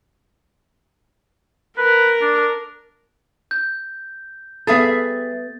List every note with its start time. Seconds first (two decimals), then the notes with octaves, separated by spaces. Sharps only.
1.78 A#4 B4
2.21 D4
3.51 G6
4.67 G3 B3 G#4 A4 E5 A6